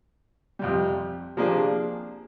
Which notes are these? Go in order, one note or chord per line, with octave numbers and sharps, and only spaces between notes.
F2 C3 G3
C3 F3 A#3 D4 G#4